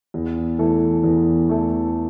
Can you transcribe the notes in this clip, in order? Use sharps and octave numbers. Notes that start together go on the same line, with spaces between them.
E2
E3 A3 E4 A4
E2
E3 A3 E4 A4